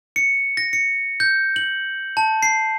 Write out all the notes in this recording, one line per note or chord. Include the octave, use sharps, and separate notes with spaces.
C#7
A#6
C#7
G6
F#7
A5
C7